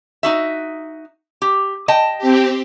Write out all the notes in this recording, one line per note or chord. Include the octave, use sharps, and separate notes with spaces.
D#4 F#4 E5
G4
D#5 G5 A5
C4 G4